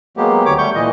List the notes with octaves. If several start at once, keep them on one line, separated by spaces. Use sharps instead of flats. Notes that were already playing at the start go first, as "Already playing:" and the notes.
F#3 G#3 A#3 B3 G4
D2 C#5 D6
G3 A3 C#6 G6
A#2 E3 D#5